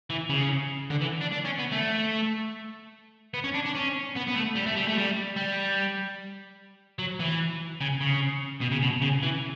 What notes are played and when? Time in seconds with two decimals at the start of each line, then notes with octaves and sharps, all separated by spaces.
0.10 E3
0.30 C#3
0.90 D3
1.01 E3
1.21 D4
1.32 D4
1.45 C#4
1.59 B3
1.72 A3
3.34 B3
3.44 C#4
3.54 D4
3.65 D4
3.75 C#4
4.16 B3
4.27 B3
4.35 A3
4.55 G3
4.66 A3
4.77 G3
4.88 A3
4.98 G3
5.37 G3
6.99 F#3
7.20 E3
7.81 C#3
8.01 C#3
8.61 B2
8.72 C#3
8.82 B2
9.02 C#3
9.23 E3